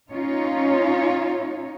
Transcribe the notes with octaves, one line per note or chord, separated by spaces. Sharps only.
C#4 D#4 F4 C#5